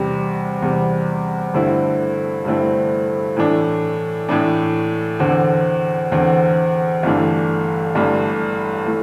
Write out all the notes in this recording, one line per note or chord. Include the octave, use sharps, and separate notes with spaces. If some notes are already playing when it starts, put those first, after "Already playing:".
Already playing: E2 C3 G3
E2 C3 G3
G2 D3 A3 C4 E4
G2 D3 A3 C4 E4
A2 E3 A3 D4
A2 E3 A3 D4
E2 D3 C4
E2 D3 C4
G1 G2 E3 A3 D4
G1 G2 E3 A3 D4
E3 A3